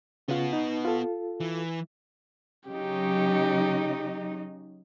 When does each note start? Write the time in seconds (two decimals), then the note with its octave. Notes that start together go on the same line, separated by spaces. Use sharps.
0.28 C#3 B3 F4 F#4
0.53 D#4
0.85 F4 A4
1.40 E3
2.68 C#3 F#3 D#4 G4